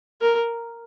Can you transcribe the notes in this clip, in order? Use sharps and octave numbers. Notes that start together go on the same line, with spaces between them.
A#4